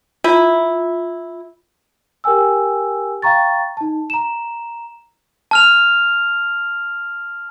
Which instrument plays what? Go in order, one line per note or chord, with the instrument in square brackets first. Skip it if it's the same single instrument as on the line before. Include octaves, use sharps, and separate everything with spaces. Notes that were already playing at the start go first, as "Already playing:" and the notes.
[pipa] E4 [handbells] F4
[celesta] G4 A#4 G5 G#5 E6
F5 G5 A#5 C#6 A6
D#4 A5
A#5 E7
[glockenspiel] A5 F6 F7